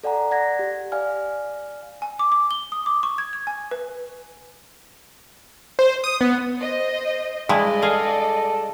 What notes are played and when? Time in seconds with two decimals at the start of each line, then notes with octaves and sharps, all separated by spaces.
0.04 A4 D5 F#5 G#5 A#5
0.31 D5 F#5 G#6 A#6
0.59 G4
0.92 D5 F5 G#5 F6
2.02 G#5
2.19 D6
2.32 D6
2.51 G7
2.72 D#6
2.86 D6
3.03 C#6
3.18 G#6
3.33 G#6
3.47 G#5
3.71 B4
5.79 C5
6.04 D#6
6.21 B3
6.57 C5 D#5
7.49 G2 G#3 E4 D5 D#5
7.82 G#4 A4 F5